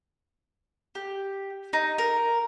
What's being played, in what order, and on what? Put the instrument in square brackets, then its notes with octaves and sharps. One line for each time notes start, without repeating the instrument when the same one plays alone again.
[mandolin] G4
D#4
A#4